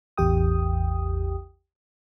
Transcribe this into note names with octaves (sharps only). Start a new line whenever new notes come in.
A1 E2 G4 G5 D#6